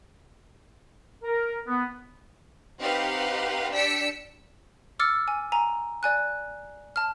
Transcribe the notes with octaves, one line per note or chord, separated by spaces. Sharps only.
A#4
B3
C4 D#4 G4 B4 F5 F#5
D4 G4 E6 B6 C#7 D7
D6 E6 F6 A6 C#7
G#5
G#5 A#5
D5 G#5 F#6
A5 F6